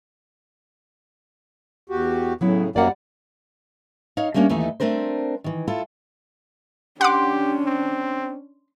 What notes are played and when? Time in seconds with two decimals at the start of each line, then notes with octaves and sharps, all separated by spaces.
1.90 E2 F#4 G4
2.41 A2 C#3 F#3 B3 E4
2.76 F#2 G3 A#3 D5 F#5
4.17 D#4 C#5 F5
4.34 G3 A3 A#3 C#4 D4
4.49 D#2 E3 A3 D#4
4.80 A3 C4 D4 A#4 C5
5.44 D#3 E3
5.68 E4 F4 A4
7.01 C#4 D4 G4 F#5 C6 D6
7.66 C4